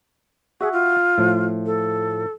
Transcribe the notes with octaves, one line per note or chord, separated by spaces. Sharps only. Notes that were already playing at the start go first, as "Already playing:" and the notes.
F#4 G#4 E5 F#5
F4
A2 F3
A4